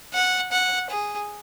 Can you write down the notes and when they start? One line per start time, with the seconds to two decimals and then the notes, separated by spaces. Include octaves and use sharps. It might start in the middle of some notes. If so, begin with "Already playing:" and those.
0.14 F#5
0.52 F#5
0.90 G#4